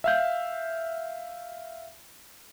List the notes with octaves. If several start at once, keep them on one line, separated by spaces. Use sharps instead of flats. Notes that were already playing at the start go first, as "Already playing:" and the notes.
E5 F5 G6